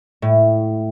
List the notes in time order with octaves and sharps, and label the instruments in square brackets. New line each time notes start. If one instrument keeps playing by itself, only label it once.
[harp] A2